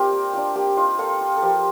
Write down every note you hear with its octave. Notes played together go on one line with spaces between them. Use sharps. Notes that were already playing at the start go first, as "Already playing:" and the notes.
Already playing: C4 D#4 F4 G4 A#4 D5
A#3
D4 F4
A#3 G4
D#4 F4
A#3 F4 A4
F4
A4
F3 G4 A#4